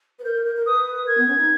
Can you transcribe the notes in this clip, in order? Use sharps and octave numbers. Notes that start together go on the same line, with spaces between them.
B4
A#4 G6
A#4
A#4
A#4
B4 D#6
A#4 G#6
B3
C#4
D#4